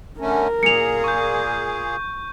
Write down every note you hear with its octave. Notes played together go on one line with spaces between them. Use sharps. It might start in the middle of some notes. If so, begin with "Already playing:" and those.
D3 A3 C#4 A#4
A#2 A#3 G#4 C#7 F7
C#6 G6